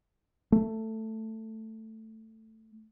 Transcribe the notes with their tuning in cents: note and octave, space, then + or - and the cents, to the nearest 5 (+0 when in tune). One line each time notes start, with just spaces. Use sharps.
A3 +10